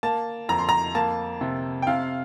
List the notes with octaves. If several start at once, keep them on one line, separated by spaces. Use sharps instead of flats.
A#3 A5
F2 A#5
C6
A#5
A#3 A5
C3
G5
C3 F5